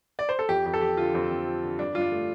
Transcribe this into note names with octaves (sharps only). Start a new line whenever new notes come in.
D5
C5
A4
F2 G4
F2 G4
A4
F3 G4
D3 F4
F2 C4
F2
F3
D3
G2 D4
G2 F4
D4
A3